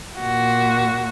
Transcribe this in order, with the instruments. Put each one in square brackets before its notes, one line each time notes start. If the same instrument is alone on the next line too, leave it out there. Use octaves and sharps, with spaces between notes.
[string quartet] A#2 F#4